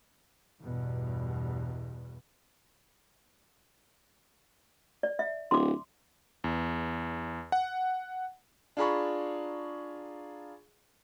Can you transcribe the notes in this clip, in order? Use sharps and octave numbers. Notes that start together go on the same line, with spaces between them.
E2 G2 B2
D5
E5
D1 C6 D6
E2
F#5
D4 F4 G#4 A#5 B5 C#6